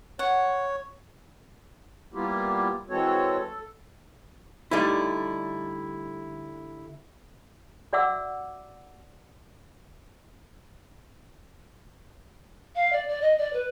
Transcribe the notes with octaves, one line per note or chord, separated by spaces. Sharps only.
C#5 F#5
G3 A#3 B3 E4 F4 G4
E3 G#3 C4 F#4 A4 C#5
A4
D3 G3 A3 D#4 E4
F#4 D5 E5 F#5 D6 E6
F5
D5
D5
D#5
D5
B4